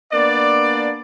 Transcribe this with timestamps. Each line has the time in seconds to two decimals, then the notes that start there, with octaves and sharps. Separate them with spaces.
0.13 A#3 B3 D4 D5